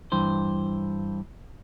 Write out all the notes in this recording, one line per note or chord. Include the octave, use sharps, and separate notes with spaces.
G2 E3 C5